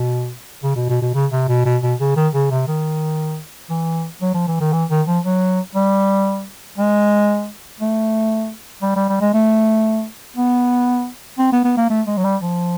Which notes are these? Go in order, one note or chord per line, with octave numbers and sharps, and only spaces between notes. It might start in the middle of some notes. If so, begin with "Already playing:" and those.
Already playing: B2
C#3
B2
B2
B2
C#3
C3
B2
B2
B2
C#3
D#3
C#3
C3
D#3
E3
F#3
F3
E3
D#3
E3
D#3
F3
F#3
G3
G#3
A3
G3
G3
G3
G#3
A3
B3
C4
B3
B3
A#3
A3
G#3
F#3
G3
F3